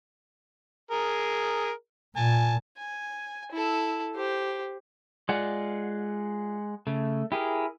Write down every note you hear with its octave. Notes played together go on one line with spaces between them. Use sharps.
G#4 A#4
A#2 G#5 A5
G#5
E4 A4
G4 C5
G#3 F4 D5 F#5
C#3 A3
E4 G4 G#4 A#4